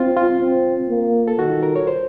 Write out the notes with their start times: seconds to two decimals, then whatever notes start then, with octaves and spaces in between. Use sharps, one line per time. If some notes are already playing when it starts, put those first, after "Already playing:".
Already playing: C4 F4
0.17 F4
0.40 C4
0.89 A#3
1.28 A4
1.39 D#3 F#4
1.63 A#4
1.76 C#5
1.87 C5